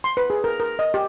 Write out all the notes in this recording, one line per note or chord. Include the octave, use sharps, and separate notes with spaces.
C6
B4
G#4
A#4
A#4
D#5
G4